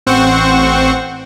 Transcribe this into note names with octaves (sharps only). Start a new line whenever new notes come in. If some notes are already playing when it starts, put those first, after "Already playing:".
A1 C4 C5 F#5 C#6